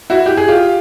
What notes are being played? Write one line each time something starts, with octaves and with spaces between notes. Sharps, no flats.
E4 F#4
G4
G#4
F4 G4